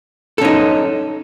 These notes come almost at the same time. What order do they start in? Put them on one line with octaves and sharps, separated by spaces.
A4 C#4 D#4